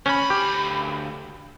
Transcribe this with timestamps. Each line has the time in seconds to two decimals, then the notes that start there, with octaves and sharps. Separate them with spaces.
0.06 D2 C#4 B5
0.30 G4